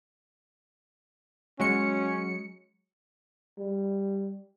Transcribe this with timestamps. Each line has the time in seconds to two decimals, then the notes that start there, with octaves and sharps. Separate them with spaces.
1.60 F#3 G#3 C#4 C#7
3.59 G3